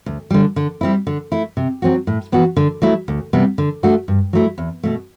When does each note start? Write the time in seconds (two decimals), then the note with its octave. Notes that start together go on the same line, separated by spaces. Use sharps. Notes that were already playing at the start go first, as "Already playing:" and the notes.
0.06 D2
0.30 D3 G3
0.56 D3
0.81 G3 C4 E4
1.07 D3
1.32 A3 E4
1.57 C3
1.82 F#3 C4 F#4
2.07 A2
2.32 E3 B3 F#4
2.57 D3
2.82 F#3 A3 E4
3.08 D2
3.33 C3 G3 B3
3.58 D3
3.83 A3 D4 F#4
4.08 G2
4.33 F#3 A3 E4
4.58 E2
4.83 B2 A3